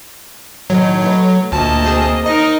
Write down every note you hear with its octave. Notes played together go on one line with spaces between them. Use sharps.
A2 D#3 F#3 D#4
A3 A4 B4
D2 A#2 A#3 D#5 A5
C4 G#4
D#2 D#4 A#4 D#5